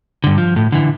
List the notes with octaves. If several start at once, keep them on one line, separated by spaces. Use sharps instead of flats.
G2 D3
F3
A2
D3 E3